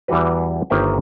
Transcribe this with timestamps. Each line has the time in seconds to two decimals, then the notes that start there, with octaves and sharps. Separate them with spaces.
0.08 E2 E3 G3 F#4 B4
0.70 G1 D#3 A#3 C5 E5 G5